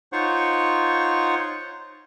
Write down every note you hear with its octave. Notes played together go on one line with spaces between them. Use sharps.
D#4 F4 C5 C#5 F#5 C#6